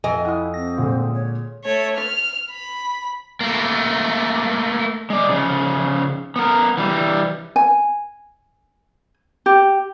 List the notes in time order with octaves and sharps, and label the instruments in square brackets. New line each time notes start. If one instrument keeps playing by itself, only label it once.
[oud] F2 D#5 [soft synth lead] G#5
[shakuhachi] E4 [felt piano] F#5 D#6
[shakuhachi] C4 [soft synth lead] A#6
[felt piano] A#2 G#3 [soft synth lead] D3
[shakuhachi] C#5
[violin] A3 C#5
F6 F7
B5
[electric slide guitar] A3 A#3
G#3 D5
C#3 F3
B3 A#4
E3 G3
[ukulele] G#5
G4